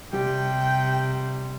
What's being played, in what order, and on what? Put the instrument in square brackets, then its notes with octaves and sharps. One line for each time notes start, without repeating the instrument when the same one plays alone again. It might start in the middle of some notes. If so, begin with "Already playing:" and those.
[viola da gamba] C3 [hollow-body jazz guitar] G3 G4 [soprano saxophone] G5